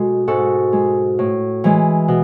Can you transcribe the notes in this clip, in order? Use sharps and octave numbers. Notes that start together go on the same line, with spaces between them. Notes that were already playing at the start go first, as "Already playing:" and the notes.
Already playing: B2 G#3 F#4 A4
G#2 F#4 A4
G#3
A2
E3 G#3
B2